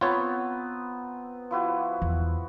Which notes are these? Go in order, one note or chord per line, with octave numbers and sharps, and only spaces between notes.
B3 C4 F4 C5 C#5 A#5
F3 E4 F#4
E2